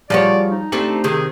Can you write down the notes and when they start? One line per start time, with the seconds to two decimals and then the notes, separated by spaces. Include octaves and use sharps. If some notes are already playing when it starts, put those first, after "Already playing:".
0.10 F3 G3 F#4 G#4 C#5 D5
0.52 D#4
0.72 A3 C4 D4 G4
1.04 C3 D#3 G#4